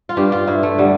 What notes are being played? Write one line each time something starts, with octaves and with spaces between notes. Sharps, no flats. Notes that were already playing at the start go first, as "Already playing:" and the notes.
F4
G2 G4
F4
G2 E4
A3
D3 G3